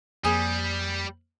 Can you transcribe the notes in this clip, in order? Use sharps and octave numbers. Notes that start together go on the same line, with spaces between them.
F2 G3 A#3 G#4